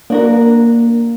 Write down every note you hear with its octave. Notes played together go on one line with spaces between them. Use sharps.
A#3 D4 F#4 A#4